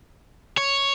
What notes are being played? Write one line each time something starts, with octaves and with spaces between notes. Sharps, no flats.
C#5